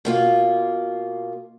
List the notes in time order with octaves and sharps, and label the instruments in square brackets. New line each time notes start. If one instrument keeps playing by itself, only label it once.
[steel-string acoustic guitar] B2 A#3 F4